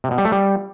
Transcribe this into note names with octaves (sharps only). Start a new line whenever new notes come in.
C3
B2
G3
A3
G3